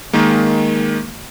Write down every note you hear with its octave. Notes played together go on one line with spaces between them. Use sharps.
D#3 G#3 A#3